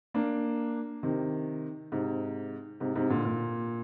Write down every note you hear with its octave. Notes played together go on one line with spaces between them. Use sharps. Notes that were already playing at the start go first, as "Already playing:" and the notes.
A#3 D4
C3 D#3
G#2 C3
G#2 C3
G#2 C3
A#2 D3
A#2